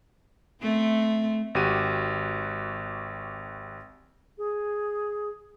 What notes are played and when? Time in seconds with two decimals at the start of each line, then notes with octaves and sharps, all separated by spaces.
0.62 A3 C4
1.55 G#1 F#4 G4 D#7
4.38 G#4